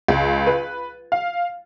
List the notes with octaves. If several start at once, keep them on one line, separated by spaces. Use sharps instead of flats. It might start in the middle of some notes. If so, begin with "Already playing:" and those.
C#2
B4
F5